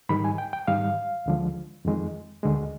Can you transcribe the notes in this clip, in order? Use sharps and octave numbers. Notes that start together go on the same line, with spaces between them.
G#2 D#3 G3 B5
G#5
G5
G5
G#2 D#3 G3 F5
D2 D3 F3 G#3
F2 D#3 G#3
D2 D3 G#3